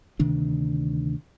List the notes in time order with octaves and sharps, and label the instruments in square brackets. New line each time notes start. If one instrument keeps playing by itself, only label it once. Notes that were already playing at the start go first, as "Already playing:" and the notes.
[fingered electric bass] D2 C3 D#3 D4